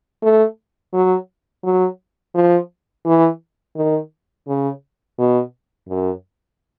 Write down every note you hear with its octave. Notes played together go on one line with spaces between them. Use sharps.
A3
F#3
F#3
F3
E3
D#3
C#3
B2
F#2